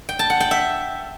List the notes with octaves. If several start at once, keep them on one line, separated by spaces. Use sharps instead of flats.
G5
A5
F#5
G5
E5